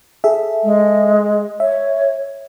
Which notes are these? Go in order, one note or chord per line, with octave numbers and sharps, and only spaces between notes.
G#4 A4 E5
G#3
C#5 E5